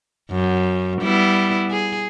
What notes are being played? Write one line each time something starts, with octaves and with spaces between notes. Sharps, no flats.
F#2
G3 B3 E4
G#4